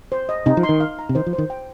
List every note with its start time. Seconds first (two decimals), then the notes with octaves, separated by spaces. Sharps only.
0.12 C5
0.29 D#5
0.46 C3 D#4
0.57 F3
0.63 C6
0.69 D#3
0.80 F5
0.99 A#5
1.09 C3
1.15 D#3 C5
1.27 F3
1.33 C5
1.38 D#3
1.50 G5